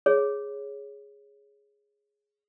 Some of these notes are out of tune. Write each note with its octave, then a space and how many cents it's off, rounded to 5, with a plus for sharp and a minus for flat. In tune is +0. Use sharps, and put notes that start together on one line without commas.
G#4 +0 C#5 +0